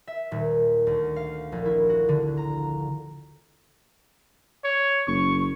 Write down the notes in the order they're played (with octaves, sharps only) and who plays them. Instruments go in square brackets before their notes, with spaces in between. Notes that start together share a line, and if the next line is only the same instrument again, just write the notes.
[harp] E5
D#1
D2
F5
A#1
E4
F#4
D3
A#5
[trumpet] C#5
[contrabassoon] F#1 [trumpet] C#6